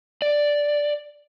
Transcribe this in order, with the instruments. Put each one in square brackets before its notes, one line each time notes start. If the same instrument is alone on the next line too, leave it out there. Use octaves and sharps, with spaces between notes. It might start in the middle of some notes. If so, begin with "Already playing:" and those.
[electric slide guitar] D5